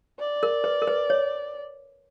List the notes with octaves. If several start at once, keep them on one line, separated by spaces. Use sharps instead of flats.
D5
A#4
B4
A#4
B4
C#5